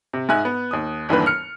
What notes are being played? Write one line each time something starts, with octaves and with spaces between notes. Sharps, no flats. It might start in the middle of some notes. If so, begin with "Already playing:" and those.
C3
G#2 D#4 E5 G#5 F#6
B3
D#2 D#6
G1 D#2 E3 D4 B4
F6 C#7